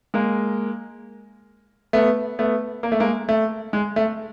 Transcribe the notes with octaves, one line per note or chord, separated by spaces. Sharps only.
G#3 A#3
A3 B3
A3 B3
A#3
A3
G#3 A#3
A3
G#3
A3